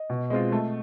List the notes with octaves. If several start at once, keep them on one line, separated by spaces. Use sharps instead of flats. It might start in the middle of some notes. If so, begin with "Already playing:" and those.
Already playing: D#5
B2
G#3 C4 F4
A3